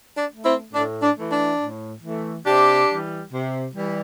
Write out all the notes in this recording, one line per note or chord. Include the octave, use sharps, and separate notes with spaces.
D4
A3
C4 E4
A2 D4
D4
E3 A3
D4
A2
E3 A3
C3 D4 G4
E3 G3
C3
E3 G3